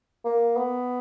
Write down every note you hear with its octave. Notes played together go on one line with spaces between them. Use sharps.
A#3
B3